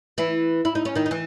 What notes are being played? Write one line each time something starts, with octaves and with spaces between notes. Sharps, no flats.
E3 E4
E4
D#4
C#4
D#3 D#4
D#4
E3